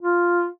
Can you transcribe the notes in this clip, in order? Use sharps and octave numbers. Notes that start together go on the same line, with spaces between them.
F4